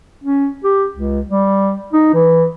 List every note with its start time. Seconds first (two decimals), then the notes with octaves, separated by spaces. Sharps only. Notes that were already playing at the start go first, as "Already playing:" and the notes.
0.24 C#4
0.64 G4
0.94 C#2
1.29 G3
1.93 D#4
2.14 E3